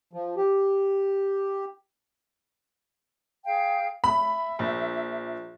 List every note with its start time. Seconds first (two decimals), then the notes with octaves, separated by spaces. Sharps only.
0.13 F3
0.37 G4
3.45 G#4 F5 G5
4.04 E5 B5
4.59 A#1